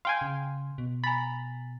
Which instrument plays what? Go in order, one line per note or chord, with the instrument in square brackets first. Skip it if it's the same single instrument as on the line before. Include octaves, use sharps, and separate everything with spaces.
[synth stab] F5 G5 G#5 [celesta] C6
[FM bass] C#3
B2
[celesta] G#5 A6 [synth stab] A#5 B5